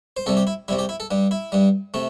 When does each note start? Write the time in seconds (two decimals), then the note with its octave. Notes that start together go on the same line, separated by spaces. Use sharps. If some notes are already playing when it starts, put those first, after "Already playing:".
0.17 C5
0.26 C2 C3 G3 A4
0.37 G4
0.47 E4
0.68 C2 C3 G3 E4
0.79 G4
0.89 E4
1.00 A4
1.11 G2 G3
1.31 E4
1.52 G2 G3
1.94 C3 A3